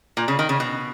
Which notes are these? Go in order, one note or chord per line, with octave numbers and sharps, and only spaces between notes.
A#2
C#3
D#3
C#3
B2